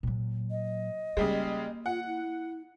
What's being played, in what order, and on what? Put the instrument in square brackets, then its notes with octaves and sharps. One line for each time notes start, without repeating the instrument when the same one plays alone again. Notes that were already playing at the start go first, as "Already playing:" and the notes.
[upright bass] A#2 F#3
[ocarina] D#5
[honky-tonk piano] C#3 G3 G#3 [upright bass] A#3
[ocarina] F4 [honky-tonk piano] F#5
[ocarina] E4